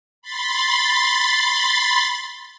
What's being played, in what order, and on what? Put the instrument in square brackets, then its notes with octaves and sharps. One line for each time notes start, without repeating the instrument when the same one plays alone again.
[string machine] B5 C6 A6